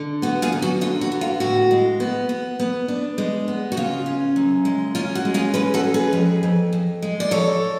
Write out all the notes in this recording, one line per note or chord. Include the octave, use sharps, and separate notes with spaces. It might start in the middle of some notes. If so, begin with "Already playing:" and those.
Already playing: D3
B3 F#4
F4 G#4
F#2
F#4
D3 F4
F#4
B3
F4
A2 F#4
G#3
B3
B3
B3
D4
G#3
B3
F#4
C#3 F4
C#4
F#2
G#3
C#4 F4
F#4
G#3
F4 G#4
C#4 G#4 B4
F#4 A4
G#3
G#4 B4
F2
F2
F2
G#3
D5
F2 A4 C#5